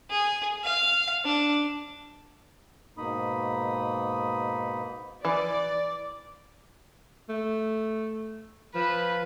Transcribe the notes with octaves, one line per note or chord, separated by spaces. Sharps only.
G#4
F5
D4
G#2 B2 A#3 D#4 B5 D#6
E3 D5
A3
F3 B4